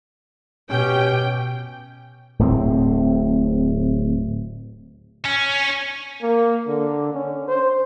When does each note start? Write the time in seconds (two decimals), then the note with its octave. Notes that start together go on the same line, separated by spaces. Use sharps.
0.70 B2 C#4 G4 G5
2.39 D1 A2 A#3 C4
5.25 C#4
6.23 A#3
6.67 D3
7.14 C#4
7.48 C5